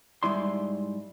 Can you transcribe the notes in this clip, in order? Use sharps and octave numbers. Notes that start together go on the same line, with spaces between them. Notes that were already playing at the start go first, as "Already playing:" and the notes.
G#2 E3 G3 E4 D5 C6